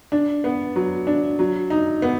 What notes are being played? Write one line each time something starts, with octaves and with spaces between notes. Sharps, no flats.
D4
B3
F#3
D4
F#3
D#4
B3